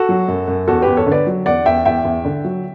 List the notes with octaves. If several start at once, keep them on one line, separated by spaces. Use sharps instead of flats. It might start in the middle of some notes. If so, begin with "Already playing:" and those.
Already playing: F#4 A4
F#3
F#2
F#2
E2 F#4 A4
G4 B4
E2
A4 C#5
D3 B4 D5
F#3
E2 D5 F#5
E2 E5 G5
E2 E5 G5
E2
D3
F#3